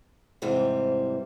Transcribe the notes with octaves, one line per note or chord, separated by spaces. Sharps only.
E2 G#2 C3 E3 G3 C5